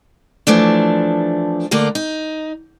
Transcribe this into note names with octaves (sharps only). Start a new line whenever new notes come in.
E3 F3 A3 D4
D3 A3 A#3 A#4
D#4